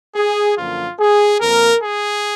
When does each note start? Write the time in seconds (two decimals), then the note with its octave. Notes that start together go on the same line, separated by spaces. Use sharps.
0.16 G#4
0.58 F#2 D3 F3 A#3 F4
1.00 G#4
1.41 F2 F3 A#3 A#4
1.84 G#4